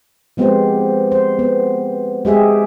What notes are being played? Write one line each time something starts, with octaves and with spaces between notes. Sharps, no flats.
F3 G#3 B3 C4 G4 C5
C5
B3
G#3 G4 G#4 E5